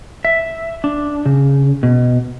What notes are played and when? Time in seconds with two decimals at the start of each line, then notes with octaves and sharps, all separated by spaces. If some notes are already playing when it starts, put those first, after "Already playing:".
0.25 E5
0.84 D4
1.26 C#3
1.83 B2